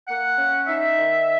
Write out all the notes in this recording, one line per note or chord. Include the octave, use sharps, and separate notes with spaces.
A#3 F#5
C#4
D#4 E5
D#3